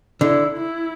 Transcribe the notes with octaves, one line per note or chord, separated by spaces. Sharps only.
D3 E4
E4